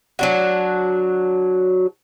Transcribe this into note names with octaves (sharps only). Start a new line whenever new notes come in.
F#3 D4 F#4